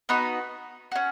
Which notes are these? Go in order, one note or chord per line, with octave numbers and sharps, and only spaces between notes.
B3 D#4 F#4 B5
C#4 F#4